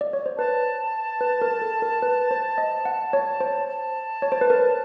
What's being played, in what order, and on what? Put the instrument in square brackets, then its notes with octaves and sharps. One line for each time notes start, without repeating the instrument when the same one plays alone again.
[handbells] D5
C#5
C5
[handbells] B4 [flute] A5
[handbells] B4
A#4
A4
A#4
B4
C5
D#5
F#5
C#5
C5
[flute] A5
[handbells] C#5
C5
B4
A#4